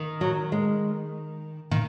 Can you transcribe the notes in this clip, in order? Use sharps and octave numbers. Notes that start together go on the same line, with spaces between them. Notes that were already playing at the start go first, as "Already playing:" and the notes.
Already playing: D#3
F#3
G#3
D#3